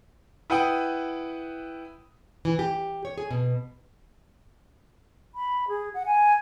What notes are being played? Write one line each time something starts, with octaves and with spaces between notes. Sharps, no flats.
E4 B4 F#5 G5 D#6
E3
G4
C#5
G#4
B2
B5
G#4
F#5
G#5